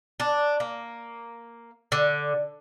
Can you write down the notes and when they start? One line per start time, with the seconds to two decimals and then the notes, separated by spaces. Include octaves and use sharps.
0.20 D4
0.60 A#3
1.92 D3